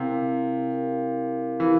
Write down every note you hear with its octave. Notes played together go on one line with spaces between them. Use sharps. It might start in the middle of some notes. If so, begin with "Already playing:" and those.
Already playing: C3 E4 G4 A#4 F5
E4 G4 A#4 F5
E3 E4 G4 A#4 F5